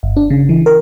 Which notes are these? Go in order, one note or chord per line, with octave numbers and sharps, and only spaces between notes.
G1
D4
C#3
E3
A#4